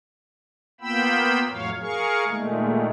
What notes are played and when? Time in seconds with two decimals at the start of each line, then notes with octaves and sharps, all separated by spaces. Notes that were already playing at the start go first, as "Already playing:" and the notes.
0.81 A#3 B3 F4 G5 B5 E6
1.49 F2 A2 E3 F#3 C#5 F5
1.80 G#4 A#4 F5 C#6
2.25 A#2 D#3 G#3 A3